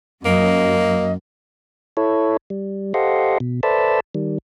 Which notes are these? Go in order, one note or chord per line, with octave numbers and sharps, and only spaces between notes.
F#2 A#3 D#5
E4 A4 C#5
G3
G4 A4 C5 D#5 F5 F#5
B2
A4 B4 C5 D5 E5 A5
D#3 G3